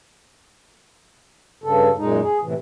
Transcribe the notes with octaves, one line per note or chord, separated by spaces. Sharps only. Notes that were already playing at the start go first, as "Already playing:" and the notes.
G2 C#3 A4
F#2 A#2 G#3 D#4
G#4
A2 C3 E3